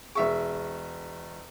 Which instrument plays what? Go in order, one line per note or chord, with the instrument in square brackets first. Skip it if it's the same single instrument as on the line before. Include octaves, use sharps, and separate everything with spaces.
[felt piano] E1 E5 C#6 [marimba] G#4